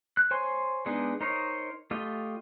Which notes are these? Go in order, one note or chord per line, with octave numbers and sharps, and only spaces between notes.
F#6
C5 C#5 G#5 C6
G#3 B3 D4 D#4 G#4
D#4 A#4 C5 C#5 D#5
A3 F4 G4 D#5